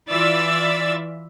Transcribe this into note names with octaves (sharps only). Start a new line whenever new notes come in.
E3 F4 D5 E5 E6 A6